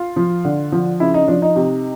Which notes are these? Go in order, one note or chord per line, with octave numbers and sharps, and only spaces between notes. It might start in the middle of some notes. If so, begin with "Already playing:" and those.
Already playing: F4
F3
D3
F3
C#3 E4
D#4
F3 D4
D#4
C3